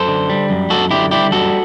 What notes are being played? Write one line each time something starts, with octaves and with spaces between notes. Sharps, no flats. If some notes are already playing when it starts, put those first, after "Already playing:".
Already playing: F#2 A4 C5
D3
G3
F#2
F#2 F#4 A4
D3 E4 G4
G3 E4 G4
F#2 F#4 A4